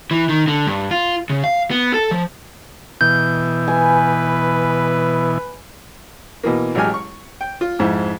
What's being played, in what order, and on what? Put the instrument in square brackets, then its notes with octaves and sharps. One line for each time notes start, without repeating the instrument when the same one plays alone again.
[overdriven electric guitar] E3
D#3
D3
G2
F4
C#3
F5
B3
A4
F3
[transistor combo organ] B2 E3 [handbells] G6
[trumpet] B4 [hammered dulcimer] G#5
[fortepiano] B2 E3 A#3
A1 F#3 G#3 G4 G#5 F6
C#6
G5
F4
F2 G#2 E4